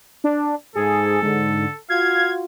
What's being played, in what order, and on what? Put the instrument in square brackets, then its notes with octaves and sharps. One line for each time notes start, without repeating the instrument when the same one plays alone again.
[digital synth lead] D4
[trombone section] G#2 [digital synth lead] G#4 [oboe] A4
[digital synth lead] G#2 [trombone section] D3
[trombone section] F4 F#4 [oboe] F5 [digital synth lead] G#6